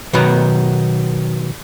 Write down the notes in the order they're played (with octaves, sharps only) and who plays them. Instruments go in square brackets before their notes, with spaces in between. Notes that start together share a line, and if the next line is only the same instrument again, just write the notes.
[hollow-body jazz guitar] B2 D#3 F#3 B3